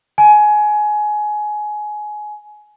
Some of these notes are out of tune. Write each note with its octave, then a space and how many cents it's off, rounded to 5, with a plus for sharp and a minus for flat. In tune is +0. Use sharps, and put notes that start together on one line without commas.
G#5 +20